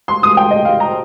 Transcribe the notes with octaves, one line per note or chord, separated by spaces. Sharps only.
C6
D#6
G5
D#5
F5
A#5